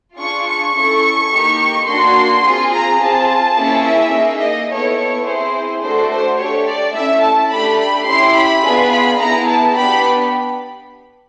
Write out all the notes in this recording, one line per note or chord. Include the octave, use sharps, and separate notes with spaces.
D4 F4 G#4 C#6
C#6
C#4 E4 A4 C#6
A#3 D#4 G4
A#3 D4 F#4 C6
C4 F4 G#4
A#5
C4 F4 G#4 A5
A#3 C#4 E4 G#4
E5
A#3 D#4 G#4
D#5
B3 E4 A4 C#5
C#5
C4 E4 G#4 C5
A3 D4 F#4 A4 C5
C5
A3 D4 G4 C#5
D5
A3 C#4 E4 E5
A5
A3 D4 G4 B5
B5
C#4 E4 G4 C6
B5
B3 D4 F4 G#4
B5
B3 E4 G#4 A#5
A5
B3 D4 G4 B5